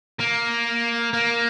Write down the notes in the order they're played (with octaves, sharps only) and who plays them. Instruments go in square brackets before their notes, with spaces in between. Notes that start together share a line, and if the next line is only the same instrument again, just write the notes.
[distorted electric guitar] A#3
A#3